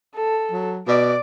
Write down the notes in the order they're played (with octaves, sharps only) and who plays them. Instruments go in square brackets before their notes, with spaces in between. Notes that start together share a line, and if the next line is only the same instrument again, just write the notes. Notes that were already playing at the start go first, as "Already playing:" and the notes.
[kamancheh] A4
[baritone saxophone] F#3
[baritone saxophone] B2 [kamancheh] D5 D6